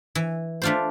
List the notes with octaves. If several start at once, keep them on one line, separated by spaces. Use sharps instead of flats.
E3
A3 D4 F4 C5